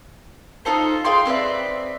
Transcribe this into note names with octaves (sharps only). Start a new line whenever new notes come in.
D#4 F4 A4 C5
G#4 F5 G5 C6
C4 B4 D5 E5